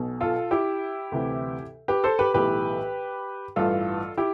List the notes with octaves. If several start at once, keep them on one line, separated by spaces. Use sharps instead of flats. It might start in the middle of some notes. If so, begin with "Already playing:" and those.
Already playing: B1 B2
F4 A4
E4 G4
D2 C3 E3
G4 B4
A4 C5
G4 B4
B1 A2 E3 G4 B4
A1 G2 E3 F4 A4
E4 G4